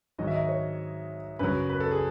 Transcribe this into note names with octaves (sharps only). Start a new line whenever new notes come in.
G#2 D#3 F#3 D#5
E5
D#5
C#5
F#2 C#3 F#3 B4
B4
A4
G#4